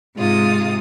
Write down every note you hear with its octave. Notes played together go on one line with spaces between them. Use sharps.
G#2 C3 G#3 F4 D#6